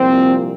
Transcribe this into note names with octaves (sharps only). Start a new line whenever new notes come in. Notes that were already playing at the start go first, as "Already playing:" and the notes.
Already playing: C2 A#2 F3 C4